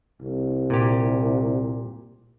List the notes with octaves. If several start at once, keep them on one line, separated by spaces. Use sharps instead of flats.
C2
A#2 G4